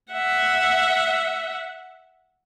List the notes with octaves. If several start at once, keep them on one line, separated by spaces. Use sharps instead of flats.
E5 F#5